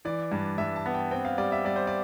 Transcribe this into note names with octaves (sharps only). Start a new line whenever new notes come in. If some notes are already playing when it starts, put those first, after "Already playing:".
E3 D5
G2
G2 E5
A5
B3
G5
C4 G5
F5
G3 D5
E5
G3 D5
C5
D5